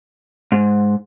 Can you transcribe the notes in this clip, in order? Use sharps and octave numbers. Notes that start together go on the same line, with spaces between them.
G#2